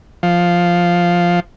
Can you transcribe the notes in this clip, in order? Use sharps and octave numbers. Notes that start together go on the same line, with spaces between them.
F3